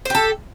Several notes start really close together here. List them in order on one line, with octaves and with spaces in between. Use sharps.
C5 G4 A4